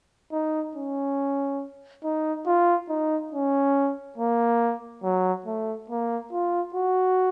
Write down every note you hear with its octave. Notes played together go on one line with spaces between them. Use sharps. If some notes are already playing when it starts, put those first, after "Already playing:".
D#4
C#4
D#4
F4
D#4
C#4
A#3
F#3
A3
A#3
F4
F#4